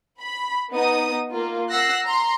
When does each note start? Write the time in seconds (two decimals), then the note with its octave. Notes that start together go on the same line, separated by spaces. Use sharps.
0.20 B5
0.72 B3 D#4 D#6
1.31 A#3 F4
1.70 F#5 E6 F#6 A#6 C7
2.05 A#5 C6